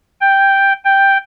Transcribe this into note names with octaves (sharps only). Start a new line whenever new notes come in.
G5
G5